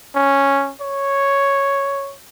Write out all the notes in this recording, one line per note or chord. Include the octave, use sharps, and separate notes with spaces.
C#4
C#5